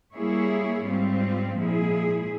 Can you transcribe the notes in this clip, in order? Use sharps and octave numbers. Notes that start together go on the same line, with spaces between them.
G3 A#3 E4 G#4 C#5
G#2 G3 C4 F4
A#2 F3 G#3 E4 G#4